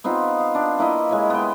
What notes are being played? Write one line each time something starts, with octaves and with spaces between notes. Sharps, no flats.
B3 C4 D#4 F4
F5
D4
A#3 E4 B4 D#5
G#3 E4 C#5
B3 G5